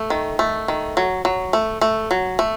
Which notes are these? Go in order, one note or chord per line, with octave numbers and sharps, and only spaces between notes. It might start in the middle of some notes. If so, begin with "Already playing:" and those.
Already playing: A3
D#3
A3
D#3
F#3
F#3
A3
A3
F#3
A3